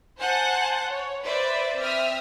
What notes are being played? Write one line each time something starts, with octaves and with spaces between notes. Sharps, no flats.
C5 F#5 G#5 A5 F#6 G6
C#5
B4 C5 D5 E5
C4 E5 D#6 F6